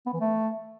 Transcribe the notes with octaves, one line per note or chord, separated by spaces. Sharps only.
B3
E3
A3